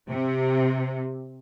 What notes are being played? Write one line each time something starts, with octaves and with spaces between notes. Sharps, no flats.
C3